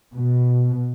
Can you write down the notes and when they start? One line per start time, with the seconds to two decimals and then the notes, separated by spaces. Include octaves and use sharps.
0.15 B2